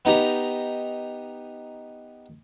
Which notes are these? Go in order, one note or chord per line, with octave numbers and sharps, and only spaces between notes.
B3 D#4 G4 A#5